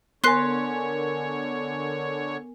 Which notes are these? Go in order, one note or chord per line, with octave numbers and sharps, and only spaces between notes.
D3 B3 A#4 C#5 G#5 C6 F#6 C7